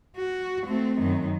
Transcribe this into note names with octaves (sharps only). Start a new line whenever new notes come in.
F#4
A3 C4
F#2 D#3